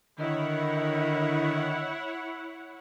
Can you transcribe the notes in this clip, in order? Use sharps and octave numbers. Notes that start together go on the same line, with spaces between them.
D3 D#3 E4 C#5 D#5 F#5